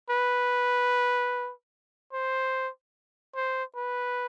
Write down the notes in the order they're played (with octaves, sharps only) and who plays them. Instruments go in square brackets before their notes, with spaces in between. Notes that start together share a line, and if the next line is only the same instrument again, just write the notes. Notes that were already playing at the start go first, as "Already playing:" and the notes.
[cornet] B4
C5
C5
B4